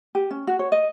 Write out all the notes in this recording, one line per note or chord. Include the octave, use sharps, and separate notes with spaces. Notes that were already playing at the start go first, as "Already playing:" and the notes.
G4
C#4
F#4
C#5
D#5